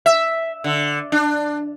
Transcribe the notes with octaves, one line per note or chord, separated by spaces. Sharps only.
E5
D3
D4